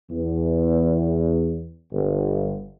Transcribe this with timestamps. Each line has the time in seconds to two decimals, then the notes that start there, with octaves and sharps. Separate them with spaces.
0.10 E2
1.92 G1